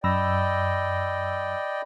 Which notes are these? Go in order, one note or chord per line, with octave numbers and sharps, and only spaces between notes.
F#2 D5 D#5 G5 B5 E6 A#6